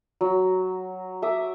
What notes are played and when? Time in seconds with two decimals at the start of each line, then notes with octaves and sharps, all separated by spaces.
0.21 F#3
1.22 E5 D6 D#6